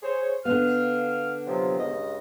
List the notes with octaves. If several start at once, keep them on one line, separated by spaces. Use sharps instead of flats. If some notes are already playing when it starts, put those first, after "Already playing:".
G#4 C5 C#5
D3 B3 F5 F6
C3 F3 F#3
C#2 G2 D#5